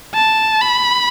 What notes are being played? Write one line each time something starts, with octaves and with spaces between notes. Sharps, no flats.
A5
B5